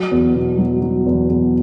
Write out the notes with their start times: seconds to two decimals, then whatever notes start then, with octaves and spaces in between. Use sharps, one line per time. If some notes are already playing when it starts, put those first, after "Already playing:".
Already playing: F#3
0.11 E2
0.35 B2
0.58 F#3
0.82 F#3
1.06 E2
1.29 E2